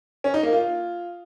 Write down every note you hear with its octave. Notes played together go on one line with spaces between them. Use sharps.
C#4
D#4
A#3
F4